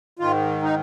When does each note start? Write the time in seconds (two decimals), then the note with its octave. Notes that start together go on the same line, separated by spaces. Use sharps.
0.19 G#2 D#3 F4
0.62 D#4